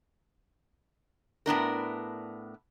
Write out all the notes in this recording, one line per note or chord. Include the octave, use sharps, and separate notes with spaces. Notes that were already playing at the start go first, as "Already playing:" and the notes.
A2 B3 D4 A#4